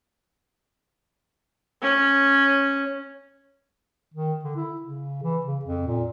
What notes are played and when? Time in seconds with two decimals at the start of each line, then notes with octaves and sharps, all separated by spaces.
1.82 C#4
4.14 D#3
4.44 D3
4.56 E4
4.81 C#3
5.23 E3
5.46 C#3
5.65 F2
5.87 A#2